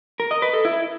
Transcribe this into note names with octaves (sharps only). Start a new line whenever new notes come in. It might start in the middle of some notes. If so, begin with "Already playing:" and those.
A#4
D#5
B4
A4
E4